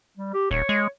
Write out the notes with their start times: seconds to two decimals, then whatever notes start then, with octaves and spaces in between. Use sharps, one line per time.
0.17 G3
0.34 G4
0.51 D#1 C#5
0.69 G#3